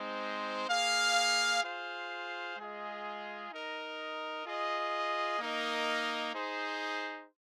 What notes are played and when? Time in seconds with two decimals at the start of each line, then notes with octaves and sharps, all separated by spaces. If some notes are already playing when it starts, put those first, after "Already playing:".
Already playing: G#3 C4 D#4 C5
0.68 A#3 G#4 F5
1.63 F4 G#4 C5 F5
2.57 G#3 F4 G#4 D#5
3.51 D#4 A#4 D#5
4.45 F4 G#4 D#5
5.39 A#3 D#4 A#4 D#5
6.33 D#4 G#4 C5